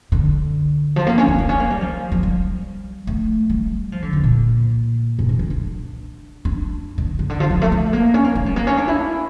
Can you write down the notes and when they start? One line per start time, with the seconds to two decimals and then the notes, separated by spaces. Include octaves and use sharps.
0.12 D3
0.96 F3
1.07 A#3
1.18 C#4
1.28 A#3
1.38 A#3
1.49 C#4
1.60 A#3
1.70 G3
1.81 F3
2.12 F3
2.23 G3
3.07 A3
3.50 G3
3.92 F3
4.02 D3
4.13 E2
4.24 A#2
5.19 A#2
5.29 E3
5.39 D4
5.50 D4
6.45 D4
6.98 D3
7.19 C#3
7.29 D3
7.40 F3
7.50 F3
7.62 A3
7.72 A3
7.93 A#3
8.14 C#4
8.24 A#3
8.35 A3
8.46 G3
8.56 A#3
8.67 C#4
8.77 D4
8.88 E4